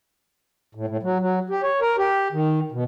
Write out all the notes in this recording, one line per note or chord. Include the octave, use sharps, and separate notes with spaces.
A2
A2
F#3
F#3
G4
C#5
A#4
G4
D#3
B2